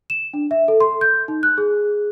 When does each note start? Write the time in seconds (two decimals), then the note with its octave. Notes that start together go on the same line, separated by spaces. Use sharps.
0.10 E7
0.34 D4
0.51 E5
0.68 A4
0.81 C6
1.01 G6
1.28 D#4
1.43 F#6
1.58 G#4